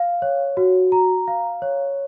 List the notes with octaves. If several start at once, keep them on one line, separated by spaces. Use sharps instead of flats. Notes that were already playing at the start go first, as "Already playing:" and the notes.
Already playing: F5
C#5
F#4
A#5
F5
C#5